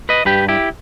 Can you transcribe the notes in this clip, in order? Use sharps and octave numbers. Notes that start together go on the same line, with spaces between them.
B4 D#5
G2 G4 B4
E4 G4